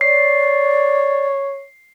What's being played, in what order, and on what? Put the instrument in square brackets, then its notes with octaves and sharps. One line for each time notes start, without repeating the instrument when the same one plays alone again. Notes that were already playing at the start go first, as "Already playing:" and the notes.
[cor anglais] C#5 [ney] D5 [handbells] C7